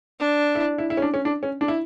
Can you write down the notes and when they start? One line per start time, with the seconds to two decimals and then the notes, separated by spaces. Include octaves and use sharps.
0.20 D4
0.55 E4
0.78 E4
0.90 E4
0.97 C#4
1.02 D4
1.14 C#4
1.25 D4
1.43 C#4
1.61 D4
1.68 E4